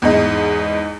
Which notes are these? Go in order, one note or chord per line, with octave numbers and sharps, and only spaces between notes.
E2 G#2 D#4